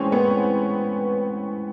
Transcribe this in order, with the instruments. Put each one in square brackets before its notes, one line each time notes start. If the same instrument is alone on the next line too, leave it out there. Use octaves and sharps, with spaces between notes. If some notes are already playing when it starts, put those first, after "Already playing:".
Already playing: [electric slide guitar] A2 E3 G#3 [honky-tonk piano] C4 C#4
[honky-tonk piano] B3